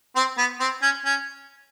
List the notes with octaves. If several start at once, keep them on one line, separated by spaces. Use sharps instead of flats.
C4
B3
C4
C#4
C#4